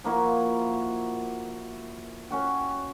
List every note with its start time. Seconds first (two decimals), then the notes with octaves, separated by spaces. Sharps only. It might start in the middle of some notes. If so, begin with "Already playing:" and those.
0.04 F3 A#3 E4 F#4
2.30 C#4 F#4 G5